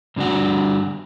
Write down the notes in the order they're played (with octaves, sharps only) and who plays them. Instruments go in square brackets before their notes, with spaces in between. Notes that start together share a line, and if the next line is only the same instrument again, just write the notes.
[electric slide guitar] G2 D3 G3 D4 F#4